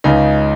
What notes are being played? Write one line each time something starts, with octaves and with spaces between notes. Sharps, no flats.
C#2 C#3 D#4